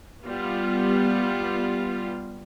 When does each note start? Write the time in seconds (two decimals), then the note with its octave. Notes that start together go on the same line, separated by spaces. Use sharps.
0.24 G3 B3 F4